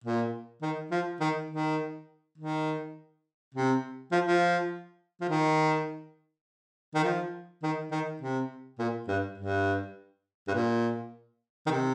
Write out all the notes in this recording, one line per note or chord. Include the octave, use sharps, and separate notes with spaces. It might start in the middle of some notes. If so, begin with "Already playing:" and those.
A#2
D#3
F3
D#3
D#3
D#3
C3
F3
F3
F3
D#3
D#3
F3
D#3
D#3
C3
A#2
G2
G2
G2
A#2
D#3
C3